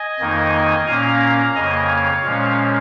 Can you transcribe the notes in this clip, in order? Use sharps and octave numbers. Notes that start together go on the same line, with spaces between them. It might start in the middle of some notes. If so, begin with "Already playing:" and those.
Already playing: D#5 G#5
F2 D#3 A#3 D#4
A#2 A#3 C#4 F5 A#5
F2 C#3 A#3 D#5 G#5
C#5 F5
A#2 F3 G#3 C#4